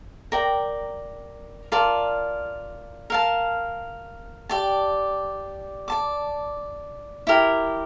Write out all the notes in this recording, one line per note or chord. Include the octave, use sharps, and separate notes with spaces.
A#4 D5 G5 A#5
F4 A#4 D5 A5
A#4 F5 A5
G4 D5 A5
D5 A5 D6
E4 G4 A#4